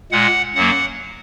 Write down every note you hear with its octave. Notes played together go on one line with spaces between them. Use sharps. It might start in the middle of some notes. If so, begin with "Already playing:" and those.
A#2 G#3 F#5
F#2 F#3 A#3 F#5